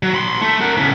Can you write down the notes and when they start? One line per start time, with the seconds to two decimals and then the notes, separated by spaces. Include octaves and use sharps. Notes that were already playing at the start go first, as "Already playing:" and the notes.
0.03 F#3
0.15 B5 C6
0.42 A3
0.61 A#4 F#5
0.77 A2 C#3